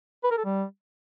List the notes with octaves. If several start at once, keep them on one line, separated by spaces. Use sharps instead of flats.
B4
A#4
A4
G3